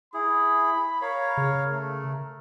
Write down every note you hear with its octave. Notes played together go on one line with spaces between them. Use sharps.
E4 G#4 B5
A#4 C#5 F5
C#3
A3 A#4